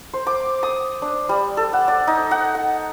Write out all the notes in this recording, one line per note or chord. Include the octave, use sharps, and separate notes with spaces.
C5
D6
D#6
D4
G3
A4
F#5
D5
D#4
F#5
F#5